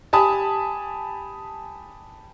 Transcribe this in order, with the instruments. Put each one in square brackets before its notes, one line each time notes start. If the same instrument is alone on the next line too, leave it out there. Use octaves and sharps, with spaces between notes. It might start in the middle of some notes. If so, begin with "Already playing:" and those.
[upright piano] G4 G#5 A5 B5 D#6